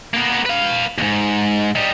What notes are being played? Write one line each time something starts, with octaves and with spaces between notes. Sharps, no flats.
A#3 B3
B4 F5
D#2 G#2
G3 D#4